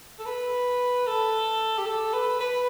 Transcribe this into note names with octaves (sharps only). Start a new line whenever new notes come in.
A4
B4
A4
G4
A4
B4
B4